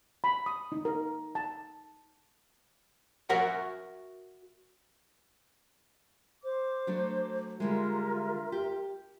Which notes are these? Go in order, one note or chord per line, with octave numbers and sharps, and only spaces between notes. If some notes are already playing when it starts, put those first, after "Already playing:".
B5
D#6
D#4
A#4
A5
F#4 A#4 E5 F#5
C5 D6
F#3 A3 D4
D3 G3 G#3 F4 A#4 E5
G4